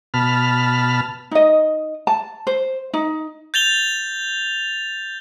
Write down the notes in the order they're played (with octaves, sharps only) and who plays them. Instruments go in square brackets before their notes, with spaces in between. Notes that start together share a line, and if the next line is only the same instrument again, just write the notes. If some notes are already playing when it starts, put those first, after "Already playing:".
[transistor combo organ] B2 A5 B5 F6
[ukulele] D#4 D#5
A5
C5
D#4
[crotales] G6 A6 F7 G7